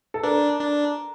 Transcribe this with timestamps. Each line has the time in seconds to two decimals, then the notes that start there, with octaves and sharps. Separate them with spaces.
0.14 A4
0.23 D4 A#4
0.59 D4